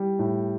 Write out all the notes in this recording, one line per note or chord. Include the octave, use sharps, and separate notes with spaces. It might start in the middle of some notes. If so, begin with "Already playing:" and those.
Already playing: G3 E4
A2